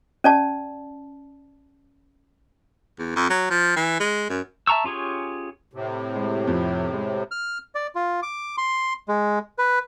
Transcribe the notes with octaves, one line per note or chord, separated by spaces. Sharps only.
C#4 D5 A5
E2
F2
F#3
F3
E3
G#3
F#2
E5 A5 A#5 C#6 E6
C#4 F4 G4 G#4 C#5
A2 C3
G#3
F2
G#3
F6
D5
F4
D6
C6
G#3
B4